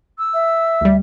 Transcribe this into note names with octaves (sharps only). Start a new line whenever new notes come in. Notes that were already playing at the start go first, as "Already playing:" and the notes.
E6
E5
D2 G3